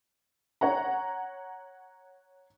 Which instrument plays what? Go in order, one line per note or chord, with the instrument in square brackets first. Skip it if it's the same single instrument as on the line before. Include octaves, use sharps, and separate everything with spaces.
[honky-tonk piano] C#5 F#5 A#5